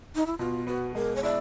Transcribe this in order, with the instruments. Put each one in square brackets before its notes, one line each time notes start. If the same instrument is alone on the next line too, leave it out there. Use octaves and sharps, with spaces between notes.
[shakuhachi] D#4
E4
[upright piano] B2 [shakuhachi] F4
[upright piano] B3 [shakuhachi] F#4
[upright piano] G#3 [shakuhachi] A#4
[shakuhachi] C#5
[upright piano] E4 [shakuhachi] D5